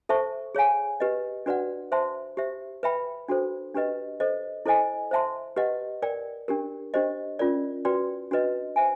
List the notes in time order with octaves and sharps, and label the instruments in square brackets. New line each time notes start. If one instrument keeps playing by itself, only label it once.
[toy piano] A4 C5 E5 A5 C#6
G#4 C#5 F5 G#5
G4 B4 D#5
D4 F#4 B4 D5 F#5
C5 E5 A5 C6
G4 C5 E5
B4 E5 G5 B5
D4 F#4 A4 C5
D4 G4 B4 D#5
A4 C5 D#5
E4 A4 C5 D#5 G#5
C5 E5 A5 C6
G4 B4 D#5 F#5
A#4 D5 G5
D4 G4 A#4
D4 G4 C5 D#5
C#4 F4 A#4 D5
F#4 B4 D5 G5 C6
D4 F#4 B4 D#5
C5 E5 G#5